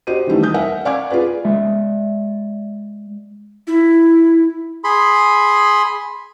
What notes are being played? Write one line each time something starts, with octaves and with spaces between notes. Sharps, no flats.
F#4 G4 C5 D#5 D#7
D#3 E3 G3 A3
D#6 G6
A#4 E5 F#5
D5 F5 F#5 C#6 D6 G#6
F4 G#4 B4 D5
G#3 D5 E5
E4
G#4 B5 C6